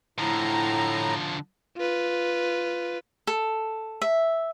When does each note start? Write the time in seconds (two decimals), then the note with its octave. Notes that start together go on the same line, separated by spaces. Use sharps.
0.18 A2 D3 F3 A#5
1.77 F4 B4
3.27 A4
4.02 E5